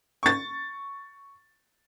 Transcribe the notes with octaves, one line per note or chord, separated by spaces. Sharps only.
C#6 A6